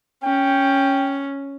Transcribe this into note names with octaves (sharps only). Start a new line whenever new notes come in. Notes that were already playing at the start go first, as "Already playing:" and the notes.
C#4 G5